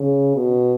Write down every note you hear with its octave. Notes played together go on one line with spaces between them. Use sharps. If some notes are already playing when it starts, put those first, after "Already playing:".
Already playing: C#3
B2